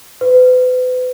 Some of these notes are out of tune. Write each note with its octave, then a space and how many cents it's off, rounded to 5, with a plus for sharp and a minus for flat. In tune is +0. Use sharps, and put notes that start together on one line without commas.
B4 +40